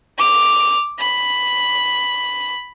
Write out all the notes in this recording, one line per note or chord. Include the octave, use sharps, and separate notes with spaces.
D6 F7
B5